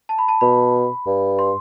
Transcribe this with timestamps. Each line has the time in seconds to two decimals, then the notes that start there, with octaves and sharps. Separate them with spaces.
0.09 A5
0.18 B5
0.29 A5
0.41 B2 B5
1.07 G2
1.39 C6